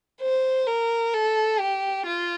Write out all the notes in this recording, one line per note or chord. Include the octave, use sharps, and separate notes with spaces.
C5
A#4
A4
G4
F4